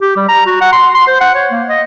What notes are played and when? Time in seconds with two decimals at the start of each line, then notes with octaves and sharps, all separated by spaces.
0.01 G4
0.17 G3
0.29 A#5
0.47 F#4
0.61 F#5
0.73 C6
0.94 C6
1.08 C5
1.21 F#5
1.35 C#5
1.51 A#3
1.69 D#5